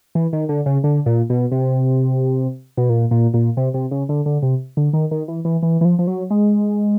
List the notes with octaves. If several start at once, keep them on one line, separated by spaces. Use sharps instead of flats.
E3
D#3
D3
C#3
D3
A#2
B2
C3
B2
A#2
A#2
A#2
C3
C3
C#3
D3
D3
C3
D3
D#3
D#3
E3
E3
E3
E3
F3
F3
F#3
G#3